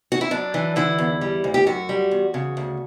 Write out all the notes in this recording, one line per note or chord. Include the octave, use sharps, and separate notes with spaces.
F#4
E4
F#2 D4
E3
D3 E4
E2
G3
D2
G4
F#2 F#4
G3
E2
C#3
D2